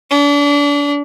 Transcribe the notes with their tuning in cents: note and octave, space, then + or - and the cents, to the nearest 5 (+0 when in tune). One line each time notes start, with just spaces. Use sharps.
D4 -35